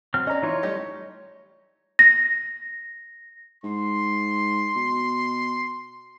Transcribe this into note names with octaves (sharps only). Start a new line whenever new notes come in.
F#3 C4 F6
C#4 D5 D#5 A#5
E3 D#4 F4 C#5
G3 A3 G4 D#5
A#6
G#2 C6
B2